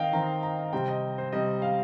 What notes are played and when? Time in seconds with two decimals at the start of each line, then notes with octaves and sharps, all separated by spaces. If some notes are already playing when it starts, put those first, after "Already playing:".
Already playing: D#3 C4 C5 D#5 F5 G5
0.13 D#3 C4 A#5
0.43 A#5
0.73 C3 G3 C4 G5
0.88 D#5
1.18 C5
1.33 C3 G3 C4 D#5
1.62 F5